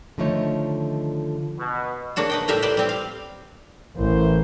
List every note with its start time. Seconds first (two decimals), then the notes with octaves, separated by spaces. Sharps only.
0.18 D3 D#3 F3 A3 D#4 C#5
1.58 B2
2.16 C#3 A#3 D4 F#4 A5
2.30 B4 D#5 G5
2.48 A2 G3 G4 A#4 E5 F5
2.62 B4 C5 D5 D#5
2.77 G3 C4 G4
2.89 F5
3.97 A1 E3 A#4 C5